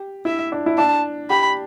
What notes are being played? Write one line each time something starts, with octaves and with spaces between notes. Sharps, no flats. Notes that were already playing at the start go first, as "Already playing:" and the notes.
Already playing: G4
E4 E5
D4
E4
D4 A5
G4 B5